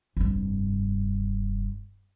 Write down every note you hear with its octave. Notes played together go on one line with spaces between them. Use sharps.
F1 G2